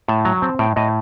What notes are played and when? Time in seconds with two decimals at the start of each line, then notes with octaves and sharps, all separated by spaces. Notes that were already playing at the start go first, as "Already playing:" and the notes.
0.08 A2 A5
0.25 F#3 A#5
0.42 C4 A5
0.59 A2 G5
0.76 A2 D#5